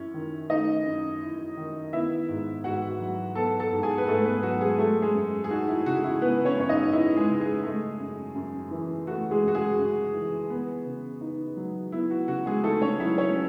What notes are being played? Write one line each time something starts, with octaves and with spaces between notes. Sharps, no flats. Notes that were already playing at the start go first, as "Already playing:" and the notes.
Already playing: F#2 C#4 E4
D#3
A3 D#4 D#5
F#2
E4
D#3
B3 E4 E5
G#2
G#2 F#4 F#5
F#3
B3 A4 A5
A4 A5
G#2
G#4 G#5
B4
G#2 A3 A4
B3 B4
F#3 F#4
G#3 G#4
G#3 A3 A4
G#3 G#4
F#2
G#4
D#4 F#4
E4
C#3 F#4
F#4
E4
G#3 B3 B4
C#4 C#5
F#2 C#5
D#4 D#5
D#4 E4
G#3 G#4
C#3
G#3 G#4
A3
F#2
F#2
E3
A3 F#4
G#3 G#4
F#2 F#4
G#3 G#4
F#2 F#4
E3
B3
C#3
D#4
F#3
B3 E4
F#4
C#3 F#4
G#3 G#4
A3 D#4 A4
C#4 C#5
F#3 E4 E5
C#4 C#5